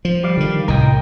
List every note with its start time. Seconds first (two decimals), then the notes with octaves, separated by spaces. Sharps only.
0.05 F3
0.23 G3 D5 F5
0.37 D3 D#3
0.68 C2 A2 A#4 D#5 G5